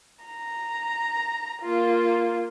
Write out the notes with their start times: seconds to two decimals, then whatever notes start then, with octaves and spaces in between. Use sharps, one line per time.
0.25 A#5
1.62 A#3 F4